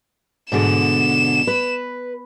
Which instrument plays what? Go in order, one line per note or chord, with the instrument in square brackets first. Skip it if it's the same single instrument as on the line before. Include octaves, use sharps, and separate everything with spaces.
[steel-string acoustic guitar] G#2 B2 D3 [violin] E7
[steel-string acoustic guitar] B4